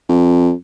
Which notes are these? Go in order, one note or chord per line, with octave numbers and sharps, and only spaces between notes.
F2